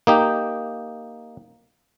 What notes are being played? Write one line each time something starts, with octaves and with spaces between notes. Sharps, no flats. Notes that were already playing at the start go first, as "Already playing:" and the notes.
A#3 D#4 G4